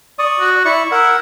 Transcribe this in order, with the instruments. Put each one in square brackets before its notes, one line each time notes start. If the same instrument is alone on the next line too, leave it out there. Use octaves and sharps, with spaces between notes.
[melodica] D5 C#6 D#6
[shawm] F#4
[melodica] E4 D5 E5 [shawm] C#6
[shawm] E4 [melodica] A#4 F#5